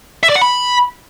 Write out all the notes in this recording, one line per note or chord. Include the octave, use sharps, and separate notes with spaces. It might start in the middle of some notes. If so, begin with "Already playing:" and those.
E5
D5
F#5
B5